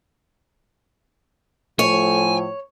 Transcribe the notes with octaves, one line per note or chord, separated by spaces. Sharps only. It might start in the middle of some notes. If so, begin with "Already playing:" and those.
A2 F3 A3 C#5 G#5